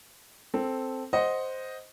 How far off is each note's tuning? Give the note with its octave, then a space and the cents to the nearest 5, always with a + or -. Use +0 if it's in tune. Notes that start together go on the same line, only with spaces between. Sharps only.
C4 +0 A4 +0
C5 +0 D#5 +0 F#5 +0